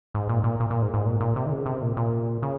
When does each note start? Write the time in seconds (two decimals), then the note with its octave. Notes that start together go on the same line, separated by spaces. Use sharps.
0.14 G#2
0.29 A#2
0.44 A#2
0.60 A#2
0.70 A#2
0.82 G#2
0.94 G#2
1.06 A#2
1.20 A#2
1.36 C3
1.46 D#3
1.52 C#3
1.66 C3
1.82 A#2
1.97 A#2
2.42 C#3